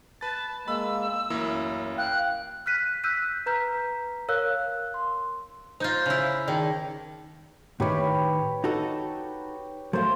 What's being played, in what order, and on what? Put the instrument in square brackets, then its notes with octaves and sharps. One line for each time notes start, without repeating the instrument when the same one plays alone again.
[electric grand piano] B4 A6 [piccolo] A5
[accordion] G#3 A#3 [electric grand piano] B5 [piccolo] E6
[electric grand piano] A1 A#3 E4 [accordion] F#2
[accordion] F5 G5 [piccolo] F#6
[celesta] F6 F#6 B6 D#7
E6 F#6 G6 B6 D#7
B4 A#5 G6 B6
A#4 C#5 F5 E6 F#6
C6
[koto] D#4 F4 [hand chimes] C5 G6 A#6
[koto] C#3 E4
[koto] D#3 [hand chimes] D#4 G#4 D5
[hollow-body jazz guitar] A2 D#3 [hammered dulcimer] G4 B4 C#5
[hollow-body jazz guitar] D#4 F#4 A4
[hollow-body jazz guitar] F#3 A3 [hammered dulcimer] C5 F5